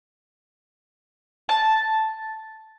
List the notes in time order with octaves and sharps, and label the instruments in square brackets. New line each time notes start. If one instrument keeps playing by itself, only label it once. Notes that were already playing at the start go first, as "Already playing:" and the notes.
[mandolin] A5